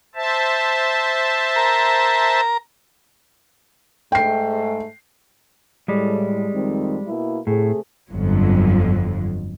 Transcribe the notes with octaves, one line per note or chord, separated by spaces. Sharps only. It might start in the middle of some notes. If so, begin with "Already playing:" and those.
C5 E5 A5
A#4 A#5
G#2 A3 G5 C7
A2 G3 G#3
F2 D#3 C4
B2 A#3 E4
A2 C3 A3 G#4
G1 F2 F#3